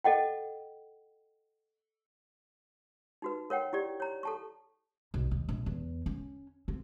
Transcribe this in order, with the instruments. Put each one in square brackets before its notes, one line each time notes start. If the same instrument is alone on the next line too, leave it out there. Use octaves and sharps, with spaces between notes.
[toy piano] A4 D#5 F#5 G5
D#4 F#4 B4
A#4 C#5 F#5 G5
E4 G4 D5
C#5 A#5
A4 A5 C#6
[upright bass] B1
D#2
A#1
E2
C#4
C4